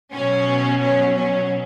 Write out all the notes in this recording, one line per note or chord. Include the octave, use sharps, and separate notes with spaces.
B2 F#3 C#4
C#4
C#4